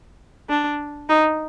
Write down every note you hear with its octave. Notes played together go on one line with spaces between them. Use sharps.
D4
D#4